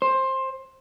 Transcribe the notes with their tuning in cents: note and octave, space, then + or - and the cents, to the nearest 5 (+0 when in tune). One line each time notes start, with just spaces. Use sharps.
C5 +15